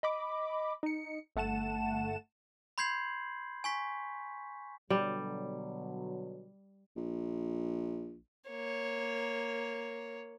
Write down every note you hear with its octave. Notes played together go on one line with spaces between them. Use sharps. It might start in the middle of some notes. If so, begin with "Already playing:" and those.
D#5 B5 D6
D#4 C#7
G1 A3 F#5 A5 E7
B5 C6 G6 G#6 C7 F#7
G#5 C#6 B6
B2 D3 F#3 G3
A#1
A#3 C#5